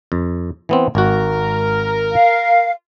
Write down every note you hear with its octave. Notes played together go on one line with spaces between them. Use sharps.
F2
E3 B3 C4
G#1 F#4 A#4
F5